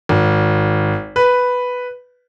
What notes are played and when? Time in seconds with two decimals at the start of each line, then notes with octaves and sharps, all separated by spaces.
0.09 G#1
1.16 B4